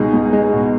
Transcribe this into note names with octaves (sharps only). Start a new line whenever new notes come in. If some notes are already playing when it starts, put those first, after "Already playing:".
Already playing: C#2 B2 D#4 G#4
C#2
G#3
B2